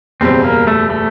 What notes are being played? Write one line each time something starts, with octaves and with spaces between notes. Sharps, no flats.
F#1 E2 B2 G3 C4
A#3
A3
A3